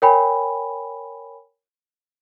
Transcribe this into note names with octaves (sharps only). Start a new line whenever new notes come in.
A#4 C#5 G5 G#5 B5